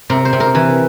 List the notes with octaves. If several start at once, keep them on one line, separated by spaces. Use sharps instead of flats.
C3 A#4
C5
C3
A#4
E3